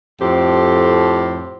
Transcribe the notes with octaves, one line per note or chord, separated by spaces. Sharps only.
F2 A2 G4 C5